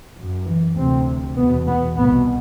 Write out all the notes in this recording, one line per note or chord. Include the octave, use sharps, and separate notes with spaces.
F#2
E3
D2 C3 C4
E2 B2 B3
B3
C2 B2 B3